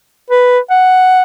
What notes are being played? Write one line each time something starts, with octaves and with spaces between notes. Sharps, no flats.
B4
F#5